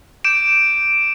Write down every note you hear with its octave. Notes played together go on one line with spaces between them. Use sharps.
D6 G6 D7 E7